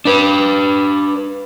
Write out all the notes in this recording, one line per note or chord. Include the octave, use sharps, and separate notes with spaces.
D4 B4